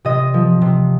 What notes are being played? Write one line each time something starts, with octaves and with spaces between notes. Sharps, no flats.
C3 D#5
F3
C3